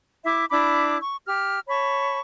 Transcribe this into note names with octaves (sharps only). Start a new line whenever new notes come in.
E4 E5 D6
D4 E4 B5 D6
C#6
G4 F6
C#5 A5 B5 C#6